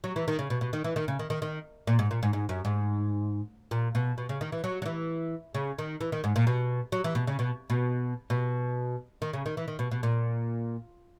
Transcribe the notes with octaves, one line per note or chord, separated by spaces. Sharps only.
F#3
E3
D#3
C#3
B2
B2
D#3
E3
D#3
C#3
D#3
D#3
D#3
A#2
G#2
A#2
G#2
G#2
F#2
G#2
A#2
B2
B2
C#3
D#3
E3
F#3
F#3
E3
C#3
D#3
E3
D#3
G#2
A#2
B2
F#3
E3
B2
C#3
B2
B2
B2
D#3
C#3
D#3
E3
D#3
B2
B2
A#2